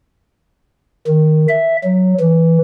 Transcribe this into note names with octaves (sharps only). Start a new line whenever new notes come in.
D#3
E5
F#3
E3